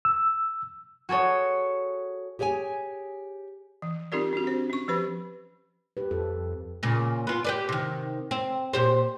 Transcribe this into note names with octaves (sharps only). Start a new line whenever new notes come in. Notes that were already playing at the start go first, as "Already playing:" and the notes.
E6
F#4 G#4 A4 C#5
G4 G#4 C#5 F5 G#5
E3
C4 D#4 F4 G4 A#4 D5
C4 D4 F#4
D4 C5
C#4 C#6
F3 G4 B4 C5 B5
G4 B4
F2 A4
A#2 C#3
B3 F4
G4 B4 D5
C3 D#3
C4
A#2 G4 C5